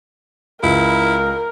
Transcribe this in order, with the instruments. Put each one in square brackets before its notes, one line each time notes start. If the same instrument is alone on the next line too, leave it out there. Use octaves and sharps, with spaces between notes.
[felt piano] C#2 [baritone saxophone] E4 [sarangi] A#4